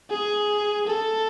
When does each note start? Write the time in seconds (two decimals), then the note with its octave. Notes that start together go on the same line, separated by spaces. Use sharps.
0.10 G#4
0.87 A4